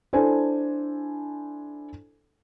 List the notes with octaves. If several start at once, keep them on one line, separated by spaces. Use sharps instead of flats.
D4 E4 A4 C5 G#5